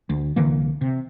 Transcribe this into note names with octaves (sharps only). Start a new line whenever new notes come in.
D2
C2 D3 E3 A#3
C3